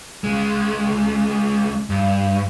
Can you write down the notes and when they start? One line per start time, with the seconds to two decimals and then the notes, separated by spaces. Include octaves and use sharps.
0.24 C#2 G#3
1.90 G2